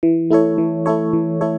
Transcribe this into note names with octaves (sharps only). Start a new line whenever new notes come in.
E3
A3 E4 A4 C#5
E3
A3 E4 A4 C#5
E3
A3 E4 A4 C#5